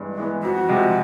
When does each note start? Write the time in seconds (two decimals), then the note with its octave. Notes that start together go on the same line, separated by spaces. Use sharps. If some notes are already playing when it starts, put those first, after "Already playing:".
Already playing: G2 E3 G#3 B3
0.17 E3 G#3 B3
0.43 F2 F#4
0.69 C3 F3 G#3